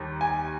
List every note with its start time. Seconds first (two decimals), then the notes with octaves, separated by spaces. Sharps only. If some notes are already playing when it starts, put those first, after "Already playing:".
Already playing: D#2 D#3 G3
0.21 G#5